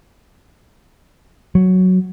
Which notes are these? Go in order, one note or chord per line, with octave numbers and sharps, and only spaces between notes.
F#3